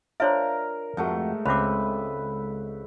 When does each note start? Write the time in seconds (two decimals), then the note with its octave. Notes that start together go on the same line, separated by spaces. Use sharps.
0.20 D4 F4 A#4 C5 C#5 E5 F5
0.97 F2 G#2 A3 F#4
1.46 C#2 C4 B4 E5 B5 D6